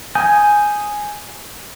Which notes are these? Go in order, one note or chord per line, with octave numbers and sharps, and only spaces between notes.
G#5 D#6 G6